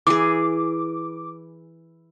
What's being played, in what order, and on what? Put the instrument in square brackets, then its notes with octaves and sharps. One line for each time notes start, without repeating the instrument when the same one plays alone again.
[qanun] E3 G#4 [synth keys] D6